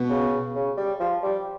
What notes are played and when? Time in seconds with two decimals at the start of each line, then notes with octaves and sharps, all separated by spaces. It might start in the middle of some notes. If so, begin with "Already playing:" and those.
Already playing: B2
0.10 C#3
0.55 C#3
0.77 G3
1.00 F3
1.23 G3